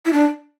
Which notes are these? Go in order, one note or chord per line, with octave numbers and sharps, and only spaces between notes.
E4
D4